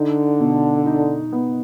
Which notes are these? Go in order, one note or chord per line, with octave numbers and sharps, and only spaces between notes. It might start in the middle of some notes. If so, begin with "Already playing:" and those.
Already playing: D3 D#4
B2
D#4
B3